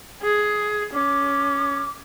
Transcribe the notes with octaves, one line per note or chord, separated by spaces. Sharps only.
G#4
C#4 D6